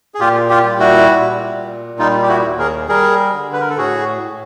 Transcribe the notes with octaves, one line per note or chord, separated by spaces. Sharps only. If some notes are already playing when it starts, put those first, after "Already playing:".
G#4
A#2 F4 G4
F4 G4
G3
E4 F#4
A#2
A#2
G3 D#4 F4
G4
E4 F#4
D#2
G#4 A#4
G3 G#4 A#4
D3
B4
A#4
A4
A2 F#4 G#4
A2